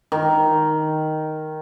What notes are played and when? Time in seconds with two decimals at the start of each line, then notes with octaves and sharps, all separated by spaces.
0.12 D#3